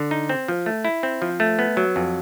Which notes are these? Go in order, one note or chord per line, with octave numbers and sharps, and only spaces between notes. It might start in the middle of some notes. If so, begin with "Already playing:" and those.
Already playing: D3
D#4
C4
F3
A3
E4
C4
F3
A3
B3
F#3
F2